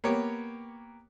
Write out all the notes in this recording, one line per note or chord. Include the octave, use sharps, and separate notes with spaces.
A#3 B3 G4 C#5